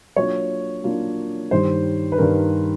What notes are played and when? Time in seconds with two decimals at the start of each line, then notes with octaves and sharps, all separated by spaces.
0.16 F#3 A#3 D4 F4 C#5
0.84 F#3 A#3 D4 F4
1.51 G2 D#3 G3 C5
2.12 B4
2.18 G2 D#3 G3 A#4